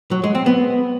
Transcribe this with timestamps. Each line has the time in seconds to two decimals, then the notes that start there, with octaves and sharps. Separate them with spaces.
0.11 F#3
0.24 G#3
0.35 C4
0.46 B3